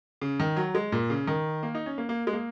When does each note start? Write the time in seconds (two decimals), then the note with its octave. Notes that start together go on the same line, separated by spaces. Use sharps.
0.22 C#3
0.40 D#3
0.57 F#3
0.75 G#3
0.92 A#2
1.10 C#3
1.27 D#3
1.63 A#3
1.74 D#4
1.86 C#4
1.98 A#3
2.09 A#3
2.27 G#3
2.33 A#3